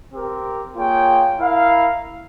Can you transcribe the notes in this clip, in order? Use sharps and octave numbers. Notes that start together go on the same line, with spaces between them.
C4 G4 A#4
A#3 F4 G#4 C#5 G5
E4 A#4 F5